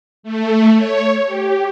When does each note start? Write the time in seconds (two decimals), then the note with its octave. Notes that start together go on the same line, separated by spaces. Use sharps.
0.23 A3
0.76 C#5
1.25 G4